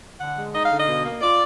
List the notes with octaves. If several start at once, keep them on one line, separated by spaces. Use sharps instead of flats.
D3 F#5
G#3
D#4 D#5
F5
D3
D#5
B2
A#3
F4 D5